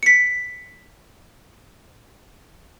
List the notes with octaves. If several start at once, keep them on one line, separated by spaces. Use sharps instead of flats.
B6 C#7